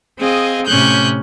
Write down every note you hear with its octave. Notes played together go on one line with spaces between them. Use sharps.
C4 G#4 D#5 F5
A2 C3 C#4 F#6 G6